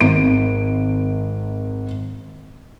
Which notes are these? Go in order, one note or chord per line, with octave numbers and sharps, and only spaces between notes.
G#1 D7